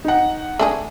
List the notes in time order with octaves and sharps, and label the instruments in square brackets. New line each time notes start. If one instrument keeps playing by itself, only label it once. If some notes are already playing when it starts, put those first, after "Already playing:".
[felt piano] D#4 F#5
[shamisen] A3 D4 G#4